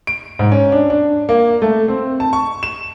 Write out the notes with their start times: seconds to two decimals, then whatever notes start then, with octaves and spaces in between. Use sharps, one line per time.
0.07 D7
0.39 G#2
0.52 C#4
0.72 D4
0.90 D4
1.29 A#3
1.62 A3
1.88 C4
2.20 A5
2.33 C#6
2.63 E7